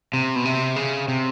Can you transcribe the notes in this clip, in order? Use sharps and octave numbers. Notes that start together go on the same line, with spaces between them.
C3
B2
C3
C#3
C3